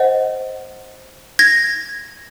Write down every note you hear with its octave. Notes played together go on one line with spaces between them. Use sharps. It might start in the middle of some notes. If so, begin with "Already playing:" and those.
Already playing: C5 D#5 F#5
G#6 A#6